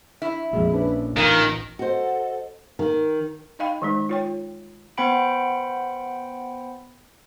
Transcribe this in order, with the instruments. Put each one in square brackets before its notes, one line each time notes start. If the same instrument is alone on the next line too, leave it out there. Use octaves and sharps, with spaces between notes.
[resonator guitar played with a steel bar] E4
[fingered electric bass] A#1 A#2 A#3 [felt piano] F2 G#3
[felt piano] C#4 D4 B4
[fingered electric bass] A1 [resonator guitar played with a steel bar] A#2 A#3 [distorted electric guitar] D#3
[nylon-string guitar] F#4 C5 [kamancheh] A4 [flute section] D#5 F#5
[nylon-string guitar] D#3
[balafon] D#4 D#5 F5 G5 B5
D#3 G#3 D#4
F4 C#5 G5
[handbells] B3 C5 F#5 G5 B5 D7